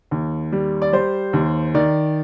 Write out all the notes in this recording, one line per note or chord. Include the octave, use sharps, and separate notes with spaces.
D#2
G3
D5
G3 C5
D#2
D#3 D5